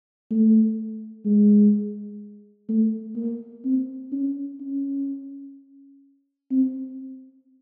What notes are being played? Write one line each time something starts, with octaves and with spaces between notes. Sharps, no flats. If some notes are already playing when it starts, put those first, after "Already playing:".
A3
G#3
A3
A#3
C4
C#4
C#4
C4